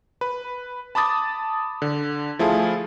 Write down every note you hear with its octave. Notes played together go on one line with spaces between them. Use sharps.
B4
A5 B5 D6 D#6 A6
D3
F3 A3 E4 F4 G#4 A4